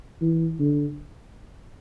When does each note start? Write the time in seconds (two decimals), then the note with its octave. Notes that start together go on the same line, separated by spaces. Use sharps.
0.21 E3
0.59 D3